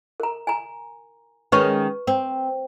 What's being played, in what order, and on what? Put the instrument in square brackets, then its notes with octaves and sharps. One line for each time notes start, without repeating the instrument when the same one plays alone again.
[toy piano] A#4 A#5
G#5 A#5
[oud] D#3 G#3 C#4 [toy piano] B4 C#6
[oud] C4